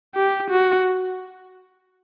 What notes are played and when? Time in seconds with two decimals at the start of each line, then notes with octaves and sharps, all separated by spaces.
0.15 G4
0.50 F#4